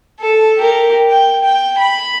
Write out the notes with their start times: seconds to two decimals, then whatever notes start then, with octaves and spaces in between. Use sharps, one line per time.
0.20 A4
0.58 G4 A#4
1.10 G5
1.43 G5
1.78 B5